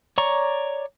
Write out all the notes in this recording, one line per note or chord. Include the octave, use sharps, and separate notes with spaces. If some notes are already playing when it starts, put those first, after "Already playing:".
C#5 D5 A#5 C#6